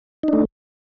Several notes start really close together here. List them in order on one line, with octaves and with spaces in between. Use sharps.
D#4 D4 A3